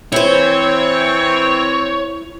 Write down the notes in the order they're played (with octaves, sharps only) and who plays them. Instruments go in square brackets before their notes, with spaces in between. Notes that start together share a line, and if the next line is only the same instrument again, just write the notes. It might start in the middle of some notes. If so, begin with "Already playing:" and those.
[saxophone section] E3 C4 [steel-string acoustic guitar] E4 C5 [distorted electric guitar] C#5